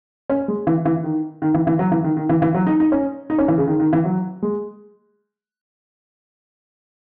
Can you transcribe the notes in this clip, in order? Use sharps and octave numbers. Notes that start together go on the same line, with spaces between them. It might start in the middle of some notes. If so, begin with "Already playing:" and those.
C#4
G#3
E3
E3
D#3
D#3
E3
E3
F#3
E3
D#3
D#3
E3
E3
F#3
D#4
D#4
C#4
D#4
C#4
E3
C#3
D#3
D#3
E3
F#3
G#3